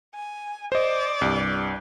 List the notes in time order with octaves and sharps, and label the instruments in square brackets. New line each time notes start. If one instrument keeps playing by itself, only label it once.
[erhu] G#5
[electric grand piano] C5 D#5 [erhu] D5
[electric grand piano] C2 G2